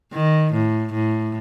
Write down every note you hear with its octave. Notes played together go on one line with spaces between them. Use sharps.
D#3
A2
A2